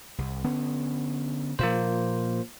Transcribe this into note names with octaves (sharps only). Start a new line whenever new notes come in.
C2
D3 B3 C#4
A#2 F3 A#3 F4 C5